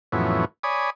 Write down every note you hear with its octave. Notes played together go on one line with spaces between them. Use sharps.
F2 A2 E3 F#3 B3 C#4
C#5 D5 G#5 B5 D#6